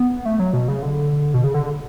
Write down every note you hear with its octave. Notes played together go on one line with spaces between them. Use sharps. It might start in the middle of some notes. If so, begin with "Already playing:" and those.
Already playing: B3
A3
F#3
B2
C#3
D3
B2
C#3
D3